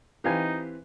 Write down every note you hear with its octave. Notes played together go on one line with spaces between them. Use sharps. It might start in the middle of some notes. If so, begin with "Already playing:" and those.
E3 C4 D#4 G4 B4 F5 G#5